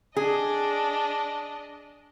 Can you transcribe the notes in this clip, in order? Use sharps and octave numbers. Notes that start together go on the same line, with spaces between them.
D4 G#4 D#5